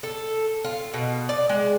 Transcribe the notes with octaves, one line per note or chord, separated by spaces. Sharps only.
A4
F4
B2
D5
G#3